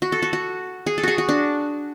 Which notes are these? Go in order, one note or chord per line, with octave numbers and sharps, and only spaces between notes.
F#4
A4
F#4
F#4
G#4
A4
F#4 G#4
F#4
D4